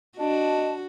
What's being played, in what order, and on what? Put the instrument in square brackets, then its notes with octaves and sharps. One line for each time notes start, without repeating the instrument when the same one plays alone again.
[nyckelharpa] D4 [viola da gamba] F#4 [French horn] D#5 [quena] A5